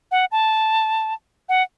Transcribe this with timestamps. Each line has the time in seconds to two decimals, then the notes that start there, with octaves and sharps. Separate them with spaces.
0.11 F#5
0.32 A5
1.49 F#5